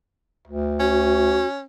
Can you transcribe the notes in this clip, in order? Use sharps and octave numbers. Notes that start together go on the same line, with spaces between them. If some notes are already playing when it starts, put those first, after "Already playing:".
D2
C#4 F#4